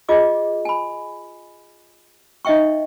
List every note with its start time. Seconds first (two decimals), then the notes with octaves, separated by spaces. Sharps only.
0.09 F4 G#4 D#5 D6
0.65 G#5 B5
2.45 D#4 D#5 E5 G5 C#6